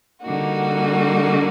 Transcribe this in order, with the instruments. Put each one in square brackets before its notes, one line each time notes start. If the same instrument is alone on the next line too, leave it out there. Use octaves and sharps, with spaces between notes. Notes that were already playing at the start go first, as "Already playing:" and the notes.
[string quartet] D3 G3 A#3 D#4 F#4